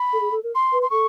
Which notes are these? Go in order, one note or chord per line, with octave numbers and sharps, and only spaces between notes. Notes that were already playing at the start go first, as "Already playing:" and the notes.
Already playing: B5
A4
G#4
A4
A#4
C6
B4
C6
A4 C#6